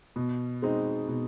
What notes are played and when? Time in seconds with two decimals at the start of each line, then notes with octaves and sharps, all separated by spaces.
0.16 B2
0.62 G#3 C4 D#4
1.08 B2